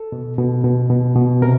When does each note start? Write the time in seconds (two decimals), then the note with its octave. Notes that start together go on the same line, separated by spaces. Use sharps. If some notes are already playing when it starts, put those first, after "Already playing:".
Already playing: A4
0.12 B2
0.39 B2
0.64 B2
0.90 B2
1.16 B2
1.42 C3 A#4